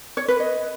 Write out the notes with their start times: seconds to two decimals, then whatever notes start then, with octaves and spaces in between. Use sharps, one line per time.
0.17 C#5
0.28 B4
0.40 D#5